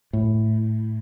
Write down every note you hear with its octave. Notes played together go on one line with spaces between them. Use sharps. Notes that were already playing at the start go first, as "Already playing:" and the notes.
A2